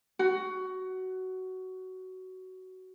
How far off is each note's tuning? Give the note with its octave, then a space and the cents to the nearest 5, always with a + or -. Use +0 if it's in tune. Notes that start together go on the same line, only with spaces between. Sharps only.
F#4 +15